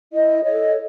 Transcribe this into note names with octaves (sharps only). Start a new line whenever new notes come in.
E4 D#5
A4 C#5 D#5